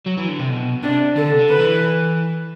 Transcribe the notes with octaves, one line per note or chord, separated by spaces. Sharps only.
F#3
E3
D3
C3
B2
C3 D4
D3 A4
C3
D3
B4
E3